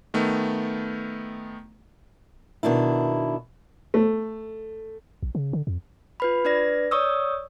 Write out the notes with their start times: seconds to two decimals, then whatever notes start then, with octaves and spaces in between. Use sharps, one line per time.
0.14 D#3 A3 B3
2.63 B2 D#3 D4 E4
3.94 A3
5.22 A#1
5.35 C#3
5.53 D3
5.67 F2
6.20 F4 B4 B5
6.45 D4 B4 D5 A#6
6.91 C#5 D5 C#6 D#6 E6